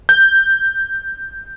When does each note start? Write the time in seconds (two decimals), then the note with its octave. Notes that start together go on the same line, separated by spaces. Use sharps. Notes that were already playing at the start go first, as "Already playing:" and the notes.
0.09 G6